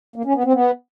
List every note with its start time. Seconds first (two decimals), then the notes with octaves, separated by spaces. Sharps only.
0.16 A#3
0.25 C#4
0.34 B3
0.44 C4
0.53 B3